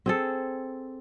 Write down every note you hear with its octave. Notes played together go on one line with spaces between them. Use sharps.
C4 G#4 A4